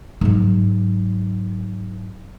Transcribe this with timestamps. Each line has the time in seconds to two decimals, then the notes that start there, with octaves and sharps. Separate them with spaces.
0.21 G#2 F#3